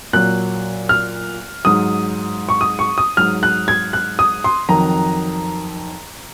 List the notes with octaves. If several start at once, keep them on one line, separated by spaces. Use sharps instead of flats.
A#2 F#3 F#6
F6
G#2 F#3 D#6
C#6
D#6
C#6
D#6
G#2 F#3 F6
F#6
G#6
F#6
D#6
C6
F2 D#3 F#3 A#5